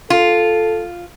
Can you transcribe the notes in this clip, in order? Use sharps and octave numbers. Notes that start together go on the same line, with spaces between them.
F4 A4